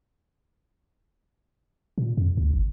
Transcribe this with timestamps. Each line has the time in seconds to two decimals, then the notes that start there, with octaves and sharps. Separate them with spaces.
1.98 A#2
2.17 F2
2.37 D2
2.53 G1